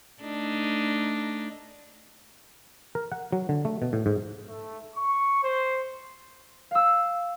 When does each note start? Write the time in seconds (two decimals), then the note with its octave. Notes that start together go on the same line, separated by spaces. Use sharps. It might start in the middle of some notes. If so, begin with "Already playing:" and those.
0.22 A3 D4 D#4
2.95 A#4
3.12 F#5
3.32 F#3
3.49 D3
3.65 A3
3.82 B2
3.93 A2
4.06 G#2
4.48 A3
4.96 C#6
5.43 C5
6.71 F5 E6